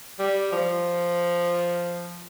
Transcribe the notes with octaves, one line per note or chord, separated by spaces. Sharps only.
G3
F3